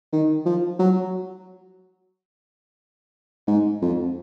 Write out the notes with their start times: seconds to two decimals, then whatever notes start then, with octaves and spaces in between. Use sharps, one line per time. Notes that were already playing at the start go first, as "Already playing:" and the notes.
0.12 D#3
0.46 F3
0.79 F#3
3.48 G#2
3.82 F2